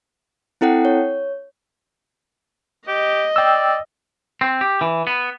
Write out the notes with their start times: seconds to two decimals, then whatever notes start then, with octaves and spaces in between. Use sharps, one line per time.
0.61 C4 E4 A4 F#5 G5
0.85 C#5
2.88 G4 D#5
3.36 D5 G5 E6
4.41 C4
4.61 G4
4.81 E3
5.07 B3